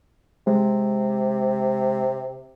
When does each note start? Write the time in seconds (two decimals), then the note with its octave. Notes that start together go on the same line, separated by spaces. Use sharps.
0.47 C3 G#3